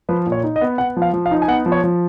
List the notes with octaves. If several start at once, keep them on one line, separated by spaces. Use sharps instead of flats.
F3 B4
A#2
C#5
D#4
D#5
B3
B3 F#5
F3
F5
F3
F5
D#4
G#5
B3 F#5
F3
C#5
F3